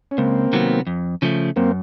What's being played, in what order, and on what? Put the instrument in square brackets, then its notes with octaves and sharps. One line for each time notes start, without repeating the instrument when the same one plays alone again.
[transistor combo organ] C#4
[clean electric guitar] C#2 [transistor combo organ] A#3 C4
[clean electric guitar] C3 D#3 F#3 B3
F2
C#3 F3 A3
[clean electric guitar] F#2 [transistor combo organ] A#3 C4